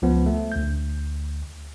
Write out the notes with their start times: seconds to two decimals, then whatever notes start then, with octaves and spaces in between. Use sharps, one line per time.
0.02 C#2 F3 B3
0.26 A3
0.52 D2 G6